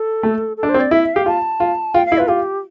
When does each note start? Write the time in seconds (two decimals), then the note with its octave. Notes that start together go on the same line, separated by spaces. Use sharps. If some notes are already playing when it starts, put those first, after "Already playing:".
Already playing: A4
0.23 A3
0.57 A4
0.63 D4
0.69 C5
0.74 C4
0.80 D5
0.91 E4 E5
1.03 E5
1.14 G4 F5
1.26 F4 A5
1.60 F4
1.94 F4 G5
2.06 F5
2.12 E4
2.18 F4 B4
2.28 F4 G4